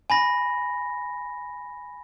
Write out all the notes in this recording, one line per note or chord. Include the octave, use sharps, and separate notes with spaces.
G#5 B5 A#6